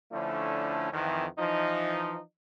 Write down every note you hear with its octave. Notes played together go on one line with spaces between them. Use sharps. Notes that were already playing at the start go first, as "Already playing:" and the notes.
D3 F3 A3 C#4 D4 E4
F2 D#3 E3
E3 F3 D#4